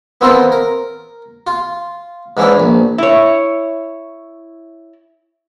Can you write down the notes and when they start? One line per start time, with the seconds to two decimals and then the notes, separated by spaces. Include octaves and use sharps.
0.21 B3 C4 E4 F4 A4 A#4
0.52 A#4
1.47 F4
2.37 G#2 E3 C#4 D4 E4
2.60 A#1
2.98 E4 C#5